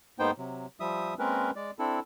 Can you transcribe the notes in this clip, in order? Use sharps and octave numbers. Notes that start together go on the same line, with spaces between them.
G#2 A#3 B3 D#4 C5 G5
C3 F#3
F3 G3 E5 D#6
G#3 A#3 C4 C#4 A#4 B4
G#3 D5
C4 D4 E4 A4